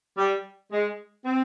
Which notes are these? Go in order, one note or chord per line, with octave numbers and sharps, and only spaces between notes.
G3
G#3
C4